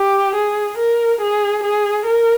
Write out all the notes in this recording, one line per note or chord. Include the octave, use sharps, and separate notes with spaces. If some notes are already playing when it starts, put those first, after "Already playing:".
Already playing: G4
G#4
A#4
G#4
G#4
A#4